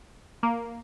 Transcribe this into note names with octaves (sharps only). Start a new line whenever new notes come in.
A#3